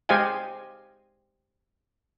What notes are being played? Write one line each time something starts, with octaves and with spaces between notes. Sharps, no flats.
G#3 G4 C5 D#5 F5 G#5